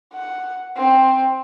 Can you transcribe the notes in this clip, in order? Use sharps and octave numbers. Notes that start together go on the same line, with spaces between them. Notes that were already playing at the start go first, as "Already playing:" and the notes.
F#5
C4